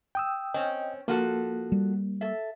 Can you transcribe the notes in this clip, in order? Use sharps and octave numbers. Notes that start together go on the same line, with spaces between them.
G5 D#6 E6
C4 C#4 D#5 G5
F3 A#3 F#4 A4
G3
A4 E5